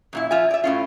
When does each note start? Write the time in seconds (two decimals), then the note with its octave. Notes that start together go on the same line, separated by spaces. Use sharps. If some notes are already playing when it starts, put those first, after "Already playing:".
0.13 F#2 A#2 E4
0.31 F3 F4 E5 G#5
0.51 D5 E5
0.64 A2 C#4 F4